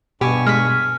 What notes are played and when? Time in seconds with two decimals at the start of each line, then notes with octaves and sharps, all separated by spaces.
0.21 G2 B2 G4 G#5 C#6
0.47 G#3 F6 B6